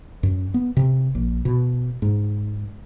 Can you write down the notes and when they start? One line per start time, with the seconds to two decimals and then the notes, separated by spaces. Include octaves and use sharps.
0.23 F#2
0.54 B3
0.77 C3
1.15 A#1
1.45 B2
2.02 G#2